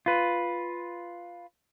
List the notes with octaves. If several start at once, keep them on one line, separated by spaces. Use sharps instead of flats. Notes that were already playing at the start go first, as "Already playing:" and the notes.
F4 B4